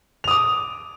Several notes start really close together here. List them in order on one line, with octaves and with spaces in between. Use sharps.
F7 D#6 D6